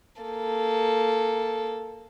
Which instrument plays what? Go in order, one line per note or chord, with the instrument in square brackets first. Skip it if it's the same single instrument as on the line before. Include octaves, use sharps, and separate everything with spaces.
[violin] A#3 A4